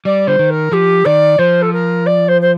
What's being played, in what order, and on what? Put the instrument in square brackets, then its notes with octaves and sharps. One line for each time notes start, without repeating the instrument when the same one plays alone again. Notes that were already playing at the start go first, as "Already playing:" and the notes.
[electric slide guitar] G3 [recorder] D5
[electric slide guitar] D3 [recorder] C5
[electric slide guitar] D#3
[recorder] A#4
[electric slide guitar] F3 [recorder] G4
[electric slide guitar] D#3 [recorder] D5
[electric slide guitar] F3 [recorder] C5
[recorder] A4
A#4
D5
C5
C5